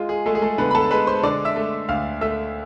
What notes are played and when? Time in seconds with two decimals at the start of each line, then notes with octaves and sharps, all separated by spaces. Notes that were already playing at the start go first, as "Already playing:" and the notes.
Already playing: G#3 F4
0.09 G#4
0.26 G#3 A3 A4
0.35 G#4
0.42 A3 A4
0.58 D3 B3 B4
0.71 B5
0.75 A4 A5
0.91 G#3 B4 B5
1.07 C5 C6
1.23 D3 D5 D6
1.45 E5 E6
1.56 A3
1.89 D2 F5 F6
2.21 A3 E5 E6